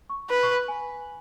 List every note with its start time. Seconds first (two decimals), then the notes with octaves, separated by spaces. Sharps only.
0.10 C#6
0.30 B4 B5
0.43 C#6
0.56 B5
0.68 G#5